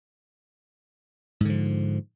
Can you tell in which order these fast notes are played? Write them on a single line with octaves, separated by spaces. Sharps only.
G#2 D3 F3